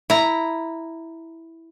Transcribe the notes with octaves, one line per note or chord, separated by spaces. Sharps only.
E4 A#5